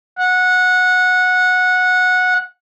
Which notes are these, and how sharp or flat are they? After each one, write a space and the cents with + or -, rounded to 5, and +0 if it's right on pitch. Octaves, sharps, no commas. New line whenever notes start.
F#5 -15